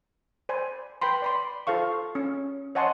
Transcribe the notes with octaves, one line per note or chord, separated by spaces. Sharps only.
C5 D5 G#5 B5
B4 G5 B5 C6
D5 B5 C6
F4 A4 C5 F5 C#6
C#4
C#5 D#5 F#5 G#5 A5 C6